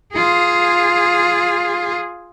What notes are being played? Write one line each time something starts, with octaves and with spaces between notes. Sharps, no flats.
F4 G#4